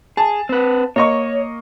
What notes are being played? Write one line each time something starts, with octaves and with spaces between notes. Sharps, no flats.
G#4 A5
C4 B4
A#3 C#5 D#5 C#6